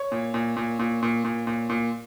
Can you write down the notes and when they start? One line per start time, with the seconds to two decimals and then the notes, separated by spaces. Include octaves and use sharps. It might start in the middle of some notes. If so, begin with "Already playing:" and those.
Already playing: C#5
0.12 A#2
0.34 A#2
0.57 A#2
0.79 A#2
1.02 A#2
1.25 A#2
1.47 A#2
1.69 A#2